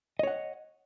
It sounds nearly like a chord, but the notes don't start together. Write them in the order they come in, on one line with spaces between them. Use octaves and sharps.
D#5 C#5 F#5